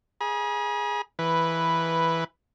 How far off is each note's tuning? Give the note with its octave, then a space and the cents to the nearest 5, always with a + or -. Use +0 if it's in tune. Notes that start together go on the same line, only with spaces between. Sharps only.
G#4 +0 B5 -45
E3 +0 B4 +0